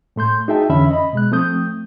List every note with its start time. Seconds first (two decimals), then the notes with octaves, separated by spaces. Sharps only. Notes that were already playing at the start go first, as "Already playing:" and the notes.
0.16 A2 A3 C6 G6
0.48 D#4 F#4 G#4 E5 G5 A5
0.69 F2 D3 E3 C#4 E5 B5
0.91 D#5 B5
1.13 B2 G#3 F#6
1.32 F3 A3 C4 D#6 G6